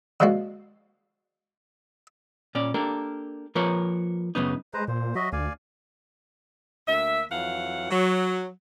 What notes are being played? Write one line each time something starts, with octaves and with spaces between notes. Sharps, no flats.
D3 F3 G#3 A#3 F#4
A#2 C#4 D5
A#3 D4 G4 A4 A#4
F3 A#3 A#4 B4 C#5
F#2 C#3 B3 D#4
G#3 B4 C5 A#5
A#2 C5
F#3 F#4 D#5 E5
D2 D5 F5 G#5
D2 A#3 E5
F2 E3 F#3 F5 F#5
F#3